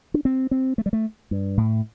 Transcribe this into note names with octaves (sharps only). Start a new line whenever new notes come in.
D4
C4
C4
A3
G3
A3
G2
A2